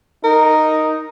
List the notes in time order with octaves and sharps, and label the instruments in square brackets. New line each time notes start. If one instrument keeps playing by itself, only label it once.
[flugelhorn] D#4 [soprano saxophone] A#4